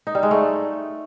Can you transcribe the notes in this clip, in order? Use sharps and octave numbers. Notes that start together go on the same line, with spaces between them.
D#4
G3
G#3
A3